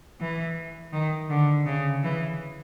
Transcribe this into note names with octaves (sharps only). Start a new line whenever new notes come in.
E3
D#3
D3
C#3
E3